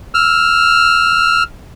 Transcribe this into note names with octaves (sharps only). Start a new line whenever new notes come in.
E6 F6